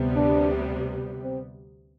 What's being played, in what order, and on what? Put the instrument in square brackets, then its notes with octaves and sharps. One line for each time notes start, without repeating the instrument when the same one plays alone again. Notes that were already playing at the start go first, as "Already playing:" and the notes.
Already playing: [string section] D2 C3 G3 B3
[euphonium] D4
C4